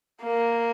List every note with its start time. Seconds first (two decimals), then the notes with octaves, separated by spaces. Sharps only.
0.22 A#3